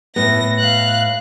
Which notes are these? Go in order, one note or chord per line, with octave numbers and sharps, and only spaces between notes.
A2 B3 A#6
F5 F#6